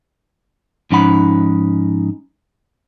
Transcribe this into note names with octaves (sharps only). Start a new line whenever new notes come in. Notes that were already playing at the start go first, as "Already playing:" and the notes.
G#2 F3 C#4 D#4 F#5 B5